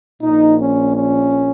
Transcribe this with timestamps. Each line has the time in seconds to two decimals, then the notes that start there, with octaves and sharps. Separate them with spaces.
0.22 A#1 A#2 D#4
0.59 C#4
0.95 C#4